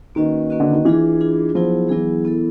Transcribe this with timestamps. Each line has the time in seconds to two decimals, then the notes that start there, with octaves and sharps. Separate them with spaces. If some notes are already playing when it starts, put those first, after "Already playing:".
0.15 D#3 A#3 C#4 F#4 B4 D#5
0.50 A#3 C#4 F#4 B4 D#5
0.60 D3
0.72 D#3
0.85 E3 D4 F4 G#4
1.21 D4 F4 G#4
1.55 F3 F#3 B3 E4 G#4
1.89 E3 F#3 B3 E4 G#4
2.25 B3 E4 A4